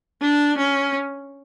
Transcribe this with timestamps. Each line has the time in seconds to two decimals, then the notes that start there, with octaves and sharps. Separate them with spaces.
0.22 D4
0.57 C#4